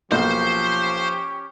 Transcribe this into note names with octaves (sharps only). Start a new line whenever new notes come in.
B1 F3 A#3 C#4 G4 C5 C6 C#6